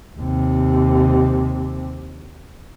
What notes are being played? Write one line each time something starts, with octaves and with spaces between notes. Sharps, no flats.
D#2 C3